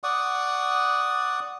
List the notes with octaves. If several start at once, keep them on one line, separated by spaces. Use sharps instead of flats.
D5 F#5 C#6 D#6